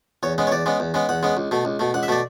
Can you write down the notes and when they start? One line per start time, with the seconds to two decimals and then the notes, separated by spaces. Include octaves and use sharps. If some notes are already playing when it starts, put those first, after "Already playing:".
0.23 E2 C#5
0.38 C#3 G#3 B3
0.47 C#5
0.52 E2 D5
0.66 C#3 G#3 B3
0.80 E2
0.94 C#3 G#3 B3
1.09 E2 F#5
1.23 C#3 G#3 B3
1.37 C#2
1.51 B2 A3
1.65 C#2
1.79 B2 A3
1.94 C#2 F#5
2.03 E5
2.08 B2 A3 D5